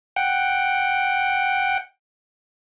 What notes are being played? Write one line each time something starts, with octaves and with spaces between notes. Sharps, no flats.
F#5 G5